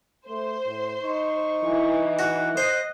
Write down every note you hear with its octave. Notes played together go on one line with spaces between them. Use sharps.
A3 C5
A2
D#4 C#6
E3
F#4 F#5
C5 D#5